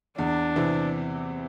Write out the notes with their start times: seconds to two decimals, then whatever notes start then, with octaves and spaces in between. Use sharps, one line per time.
0.18 E2 D4
0.56 C3 E3 C4